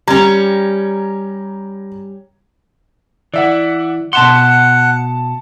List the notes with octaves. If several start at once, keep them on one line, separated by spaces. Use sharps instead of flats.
G3 C#4 A#5 G#6
E3 D5 E5 F#5
B2 E5 F#5 A5 C6 C#7